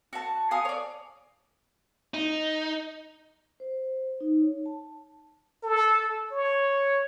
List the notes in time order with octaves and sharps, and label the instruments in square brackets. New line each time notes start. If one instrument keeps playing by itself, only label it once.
[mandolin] F#4 A5
B3 F5 G#5 D#6
C#5 D5
[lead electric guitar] D#4
[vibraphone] C5
D#4
C#5
A5
[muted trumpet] A4
C#5